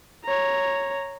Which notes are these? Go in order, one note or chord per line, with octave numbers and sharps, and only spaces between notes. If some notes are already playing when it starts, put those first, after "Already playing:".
C#5 A#5